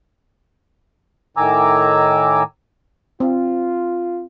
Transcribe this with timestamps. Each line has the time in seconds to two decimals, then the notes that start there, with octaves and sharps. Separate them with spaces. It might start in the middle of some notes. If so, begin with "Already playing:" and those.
1.37 A2 D#3 G#5 A#5 D6 E6
3.20 C4 F4